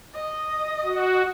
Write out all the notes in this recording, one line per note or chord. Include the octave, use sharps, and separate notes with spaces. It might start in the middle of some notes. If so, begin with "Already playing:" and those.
D#5
F#4